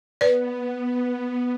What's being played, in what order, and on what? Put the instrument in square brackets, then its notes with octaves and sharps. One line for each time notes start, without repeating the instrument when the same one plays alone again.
[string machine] B3 [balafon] B4 D5